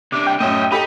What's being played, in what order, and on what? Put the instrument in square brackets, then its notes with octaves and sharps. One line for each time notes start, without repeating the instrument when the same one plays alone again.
[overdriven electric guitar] C3 D4 [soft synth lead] D6
[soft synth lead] G5
[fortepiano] F#2 A2 [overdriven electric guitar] D#5 E5
[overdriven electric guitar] D#4 [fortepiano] G4 A4 G5 [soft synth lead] B5